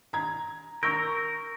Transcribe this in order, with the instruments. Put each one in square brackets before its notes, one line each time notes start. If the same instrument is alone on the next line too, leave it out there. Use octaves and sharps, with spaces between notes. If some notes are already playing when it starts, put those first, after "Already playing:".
[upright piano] A#5 G#6
[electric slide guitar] A#4 [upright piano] C#6 E6 G6